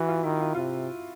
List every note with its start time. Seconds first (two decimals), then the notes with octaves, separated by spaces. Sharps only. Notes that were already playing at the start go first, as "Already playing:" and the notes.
Already playing: E3 F#4
0.08 F4
0.23 D#3 E4
0.40 F4
0.55 C3 F4